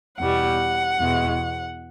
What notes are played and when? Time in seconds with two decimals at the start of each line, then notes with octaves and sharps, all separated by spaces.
0.20 E2 B2 G3 F#5
1.00 E2 B2 G#3